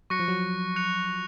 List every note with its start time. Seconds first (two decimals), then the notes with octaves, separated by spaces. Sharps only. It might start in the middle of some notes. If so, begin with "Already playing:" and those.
0.10 F#3 C#6 F#6 A#6 C#7
0.19 F3
0.28 F#3
0.76 F#6 C#7 F7